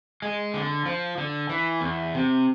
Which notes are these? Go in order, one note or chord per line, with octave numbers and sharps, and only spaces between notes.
G#3
D3
F3
D3
E3
E2
C3